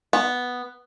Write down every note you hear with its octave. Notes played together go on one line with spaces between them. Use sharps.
B3